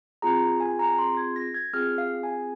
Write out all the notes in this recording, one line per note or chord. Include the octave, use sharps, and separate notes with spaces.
C4 F4 G#4 A#5
G#5
A#5
C6
G#6
A#6
G#6
C4 F4 G#4 F6
F5
G#5